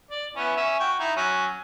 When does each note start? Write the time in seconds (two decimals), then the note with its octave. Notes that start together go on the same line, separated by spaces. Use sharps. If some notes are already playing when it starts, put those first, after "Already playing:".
0.11 D5
0.36 B3 C#4 E4
0.57 C#4 E5
0.80 F#4 G5 C#6
0.99 D#4 E4
1.16 F#3 C#4